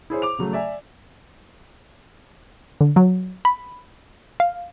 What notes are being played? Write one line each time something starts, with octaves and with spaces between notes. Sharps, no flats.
E4 G#4 C5 C#5
D6 F7
C#3 F#3 A3
D5 E5 G#5
D3
F#3
B5
F5